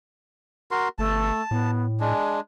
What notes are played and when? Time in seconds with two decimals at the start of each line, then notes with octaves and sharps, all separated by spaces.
0.71 F#4 A#4 C6
0.98 G1 A3 A5
1.51 A2 B3
2.00 G#3 D4 G#5